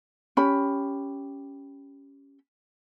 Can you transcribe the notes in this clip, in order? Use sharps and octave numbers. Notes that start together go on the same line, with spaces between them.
C#4 G4 B5